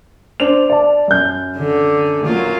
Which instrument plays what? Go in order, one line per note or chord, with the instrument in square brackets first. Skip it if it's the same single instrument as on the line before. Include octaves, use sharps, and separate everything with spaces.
[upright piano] D4 C5 F7
D5 A5
F#2 G6
[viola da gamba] D3
F#3 A#3 F4